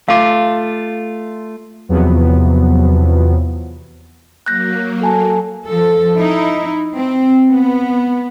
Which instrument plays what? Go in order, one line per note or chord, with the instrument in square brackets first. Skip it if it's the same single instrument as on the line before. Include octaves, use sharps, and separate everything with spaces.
[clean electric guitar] A3 F4 [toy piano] F5 D6
[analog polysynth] E2 C3 F3 F#3 B3
[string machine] F#3 A#3 [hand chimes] F#6 G6 A#6
[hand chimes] A4 G#5 A5
[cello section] F3 A4
D#4 E4
C4
B3